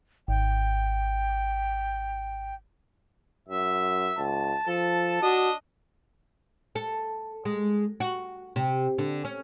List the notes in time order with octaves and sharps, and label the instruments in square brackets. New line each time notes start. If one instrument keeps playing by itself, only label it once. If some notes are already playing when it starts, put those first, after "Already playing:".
[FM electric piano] G#1 [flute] G5
[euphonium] F#2 [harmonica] E5
[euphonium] C#2 [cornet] A5
[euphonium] F3 [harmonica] A4
[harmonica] D4 D#5 [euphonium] F#4
[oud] A4
G#3
F#4
C3
D3
C#4